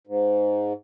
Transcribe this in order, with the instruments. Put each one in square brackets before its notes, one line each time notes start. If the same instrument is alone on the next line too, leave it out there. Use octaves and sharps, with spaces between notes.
[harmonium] G#2